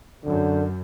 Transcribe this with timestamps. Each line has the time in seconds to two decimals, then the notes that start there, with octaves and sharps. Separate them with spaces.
0.24 F#2 D3